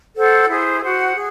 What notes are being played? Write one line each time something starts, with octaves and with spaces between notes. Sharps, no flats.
A4 C5 F#5
E4 G#4 C5
F#4 C5 F#5
G#4